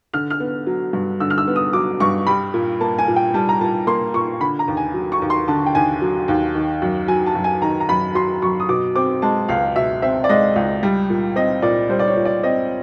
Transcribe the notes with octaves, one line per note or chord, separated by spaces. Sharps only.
D3 F6
F6
B3
F#3
G2
D3 E6
F6
E6
B3
D#6
F#3 D6
G2 C#6
G3 B5
A#2
A#3 A5
G#5
A#2
G5
G3 A5
A#5
A#2 A5
A#3 C6
A#2 C#6
D3 B5
A#5
D#2
G#5
F#3
C#6
D#2
C6
D3 A5
G5
D#2 G#5
F#3
D#2
D#3
F#2
F#3 G#5
A5
F#2
G#5
D#3 A#5
A#5
F#2 B5
F#3 C6
F#2 C#6
D#6
B2 D6
C4 D6
G#3 A5
C#2 F5
B2 E5
C4 E5
D5
G#3 D#5
C#2
G3
A#2
C4 D#5
A#2 D5
G3 C5
D5
C#5
A#2
D5
C4 D#5